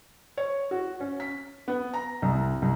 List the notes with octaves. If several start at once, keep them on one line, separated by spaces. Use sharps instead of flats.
C#5
F#4
C#4
B6
B3
A#5
C2
C2